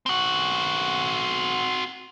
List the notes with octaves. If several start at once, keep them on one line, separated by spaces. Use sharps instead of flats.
C4 F#4